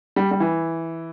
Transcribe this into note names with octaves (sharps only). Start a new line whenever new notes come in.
G3
G3
E3